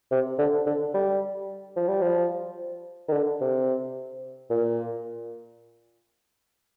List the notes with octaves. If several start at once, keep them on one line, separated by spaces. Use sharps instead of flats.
C3
D3
D3
G3
F3
G3
F3
D#3
D3
C3
A#2